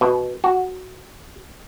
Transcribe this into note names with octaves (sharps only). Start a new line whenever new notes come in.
B2
F#4